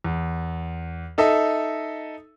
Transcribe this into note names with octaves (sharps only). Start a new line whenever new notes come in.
E2
D#4 A4 D#5 E5